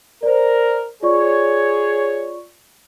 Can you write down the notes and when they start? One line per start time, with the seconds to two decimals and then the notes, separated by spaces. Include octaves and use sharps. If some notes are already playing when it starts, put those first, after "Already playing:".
0.23 A#4 C5 D5
1.03 F4 G#4 C#5 D5 C#6